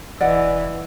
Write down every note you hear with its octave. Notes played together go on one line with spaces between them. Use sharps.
E1 E3 D5 D#5 F#5